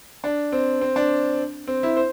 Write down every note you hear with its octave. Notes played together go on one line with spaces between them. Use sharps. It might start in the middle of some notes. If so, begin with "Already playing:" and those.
D4
C4
C4
D4
C4
E4
C5